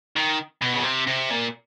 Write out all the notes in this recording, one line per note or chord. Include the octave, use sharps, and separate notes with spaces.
D#3
B2
C#3
C3
C3
A#2